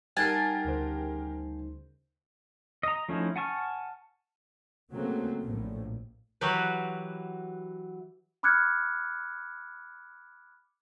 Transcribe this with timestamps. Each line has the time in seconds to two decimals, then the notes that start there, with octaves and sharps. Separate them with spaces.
0.17 G3 D#4 G4 A#4 F#5 G#5 A5 C7
0.65 D2 C#3 C5
2.83 D#5 A#5
3.09 F3 A3 C#4 D#4 E4
3.36 F#5 G#5 A5 C#6 F6
4.92 C#3 F#3 A3 A#3 C4
5.43 A#1 A2
6.41 E3 F#3 F#4 G4 B4
8.43 B5 D6 F6 F#6 G#6 C#7